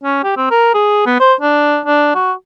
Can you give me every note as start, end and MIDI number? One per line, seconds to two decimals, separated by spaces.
0.03 0.19 61
0.24 0.32 67
0.36 0.46 60
0.51 0.74 70
0.74 1.05 68
1.06 1.19 59
1.20 1.34 72
1.41 1.80 62
1.86 2.11 62
2.15 2.32 66